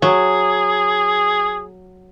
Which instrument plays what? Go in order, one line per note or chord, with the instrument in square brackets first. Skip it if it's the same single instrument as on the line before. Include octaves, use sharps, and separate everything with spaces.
[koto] F#3 [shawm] G#4